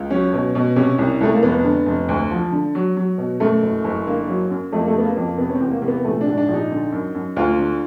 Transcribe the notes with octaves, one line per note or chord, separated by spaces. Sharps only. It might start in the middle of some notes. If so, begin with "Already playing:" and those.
Already playing: C#2
F#3 C#4
B2
B2
C3 C#4
C2
C2 A3
A#3
F1 B3
D3
F1
D2
F3
D3
F#3
F#3
B2
F#2 A3
F#1
F#1
D3 A#3
F#3
F#2
F2 A3
A#3
A3
C#3 B3
A#3
F2
C3 B3
C#4
C4
E2
A#3
C3 A#3
B3
A#1 A3
D4
G#2
D4
A#1
D#4
D3
F#2
F#2
D2 F4
D3